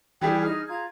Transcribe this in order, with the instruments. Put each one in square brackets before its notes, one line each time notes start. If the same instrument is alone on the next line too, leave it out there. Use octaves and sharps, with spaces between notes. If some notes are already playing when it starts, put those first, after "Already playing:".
[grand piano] E3 G3 G#4 [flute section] G5
[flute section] D#4 F6 [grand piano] G#4
[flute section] F4 A#5 G#6